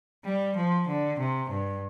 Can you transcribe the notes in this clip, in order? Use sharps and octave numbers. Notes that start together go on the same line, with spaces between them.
G3
F3
D3
C3
G2